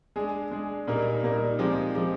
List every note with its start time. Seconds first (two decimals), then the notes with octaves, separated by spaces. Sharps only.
0.16 G#3 D4 G#4
0.51 G#3 D4 G#4
0.87 A#2 G3 A#3 D#4 A#4
1.23 A#2 G3 A#3 D#4 A#4
1.59 F3 G#3 C4 D#4 G4
1.95 F3 G#3 C4 D#4 G4